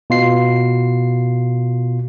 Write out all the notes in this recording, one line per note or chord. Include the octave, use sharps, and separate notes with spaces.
B2 F4 C7